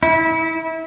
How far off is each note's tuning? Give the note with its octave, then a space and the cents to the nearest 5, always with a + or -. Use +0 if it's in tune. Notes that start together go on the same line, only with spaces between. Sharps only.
E4 -25